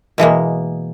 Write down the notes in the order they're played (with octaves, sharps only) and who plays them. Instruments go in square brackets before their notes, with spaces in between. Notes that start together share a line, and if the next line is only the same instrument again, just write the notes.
[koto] B2 E3 G#3 A#3